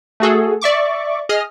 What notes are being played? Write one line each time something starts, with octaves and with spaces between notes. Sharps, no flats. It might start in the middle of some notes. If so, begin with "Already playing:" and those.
A3 F#4 G#4 A4
D5 E5 C#6 D6
G#4 D#5 D#6 F6